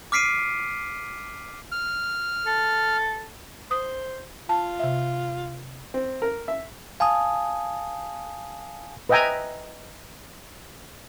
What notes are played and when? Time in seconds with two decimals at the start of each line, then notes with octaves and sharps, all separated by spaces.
0.12 D6 F6 B6 C7 D7 D#7
1.72 F6
2.46 A4
3.71 C5 D#6
4.49 F4 A5
4.80 C3 E5
5.94 C4
6.22 A#4
6.48 E5
7.00 F5 G#5 A5 D#6
9.09 B4 D#5 E5 G5 G#5 A#5